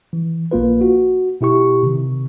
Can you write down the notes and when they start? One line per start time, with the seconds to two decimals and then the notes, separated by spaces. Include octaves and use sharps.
0.13 E3
0.51 A#1 A#3 F4 B4
0.81 F#4
1.41 B2 E4 G4 C#6
1.83 C3 D#3